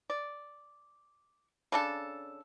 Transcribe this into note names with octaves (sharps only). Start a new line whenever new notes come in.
D5
C#3 D4 A4